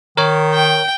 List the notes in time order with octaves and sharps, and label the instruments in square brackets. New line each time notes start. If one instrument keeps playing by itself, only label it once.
[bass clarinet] D#3 [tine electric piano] A#4 C#5
[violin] G5